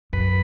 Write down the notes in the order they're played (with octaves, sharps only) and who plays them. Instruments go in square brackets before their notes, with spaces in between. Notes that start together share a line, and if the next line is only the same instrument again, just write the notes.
[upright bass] F#2 [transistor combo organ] B4